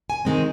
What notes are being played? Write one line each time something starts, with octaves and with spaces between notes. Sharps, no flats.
G#5
D#3 G#3 C4